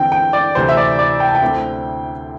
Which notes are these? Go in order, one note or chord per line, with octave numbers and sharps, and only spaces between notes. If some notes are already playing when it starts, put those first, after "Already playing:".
Already playing: E2 D3 C4 G5
G5
D5
D2 C3 E3 C5
E5
D5
D5
G5
A5
G5
D2 D3 C4 E4